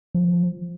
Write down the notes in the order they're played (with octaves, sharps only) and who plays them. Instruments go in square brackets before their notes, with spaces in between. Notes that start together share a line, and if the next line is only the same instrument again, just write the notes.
[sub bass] F3